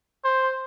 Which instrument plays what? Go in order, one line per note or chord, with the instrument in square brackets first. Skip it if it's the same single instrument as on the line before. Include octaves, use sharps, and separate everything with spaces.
[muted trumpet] C5